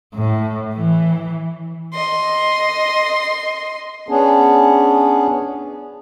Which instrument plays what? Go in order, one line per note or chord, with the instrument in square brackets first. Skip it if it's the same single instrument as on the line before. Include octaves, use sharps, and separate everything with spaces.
[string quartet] A2
E3
[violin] D#5 C6
[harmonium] B3 C#4 D4 G#4